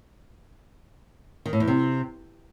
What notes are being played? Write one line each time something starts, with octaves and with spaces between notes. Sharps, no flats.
D#3
A2
E2
C3